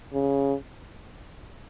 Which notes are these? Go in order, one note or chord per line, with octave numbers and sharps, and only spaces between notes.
C#3